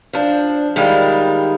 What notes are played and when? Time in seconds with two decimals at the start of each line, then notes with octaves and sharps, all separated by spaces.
0.13 F3 D4
0.76 D#3 G3 G#3 E4 F4